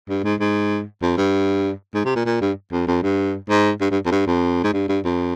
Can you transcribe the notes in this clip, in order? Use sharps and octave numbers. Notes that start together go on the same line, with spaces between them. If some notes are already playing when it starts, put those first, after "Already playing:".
G2
G#2
G#2
F2
G2
G#2
C3
A#2
A#2
G2
F2
F2
G2
G#2
G2
G2
F2
G2
F2
G#2
G2
G2
F2